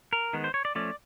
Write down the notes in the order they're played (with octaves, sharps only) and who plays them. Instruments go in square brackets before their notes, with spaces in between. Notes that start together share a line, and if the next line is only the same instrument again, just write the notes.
[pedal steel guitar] A#4
D#3 G#3 B3
C5
C#5
D5
F3 A3 C#4 D5